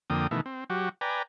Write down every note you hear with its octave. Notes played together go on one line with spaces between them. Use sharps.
F2 D3 A#3 G5 D#6
B2 D#3 E3 A3
C4
F#3 F#4 G4
B4 D5 G5 G#5 A#5